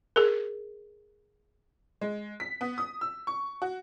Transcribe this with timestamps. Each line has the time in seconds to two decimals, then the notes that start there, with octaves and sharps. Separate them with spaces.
0.16 G#4 A#4
2.01 G#3
2.40 B6
2.61 B3
2.78 D#6
3.01 E6
3.27 C#6
3.62 F#4